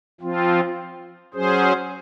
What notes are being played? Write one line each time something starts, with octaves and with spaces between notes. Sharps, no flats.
F3 C4 F4
F#3 C#4 G#4 C5